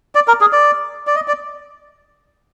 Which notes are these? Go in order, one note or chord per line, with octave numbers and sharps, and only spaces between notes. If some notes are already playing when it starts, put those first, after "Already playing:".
D5
A#4
G#4
D5
D5
D#5
D5